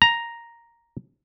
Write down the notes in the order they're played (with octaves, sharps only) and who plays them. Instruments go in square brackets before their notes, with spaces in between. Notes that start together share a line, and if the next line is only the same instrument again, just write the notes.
[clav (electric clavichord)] A#5